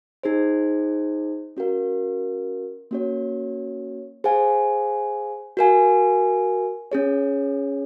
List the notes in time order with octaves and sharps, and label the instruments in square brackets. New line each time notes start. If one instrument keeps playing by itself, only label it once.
[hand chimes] D#4 G#4 C5
C#4 F#4 A#4 F5
A#3 C#4 F#4 C#5
G#4 C5 F5 G#5
F#4 A#4 F5 G#5
C#4 G#4 C#5